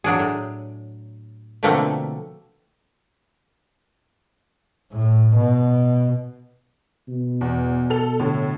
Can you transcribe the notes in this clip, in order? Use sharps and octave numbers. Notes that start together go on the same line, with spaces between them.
F#3 D4 G#4
A2
B2 D3 F3 A3 A#3 C4
A2
B2
B2
E2
A4 F7
A2 D3